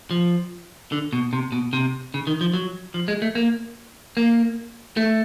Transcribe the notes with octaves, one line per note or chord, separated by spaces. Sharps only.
F3
D3
B2
C3
B2
C3
C#3
D#3
F3
F#3
F3
G#3
A3
A#3
A#3
A3